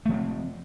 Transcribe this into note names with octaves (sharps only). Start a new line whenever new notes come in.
F3 A3 C4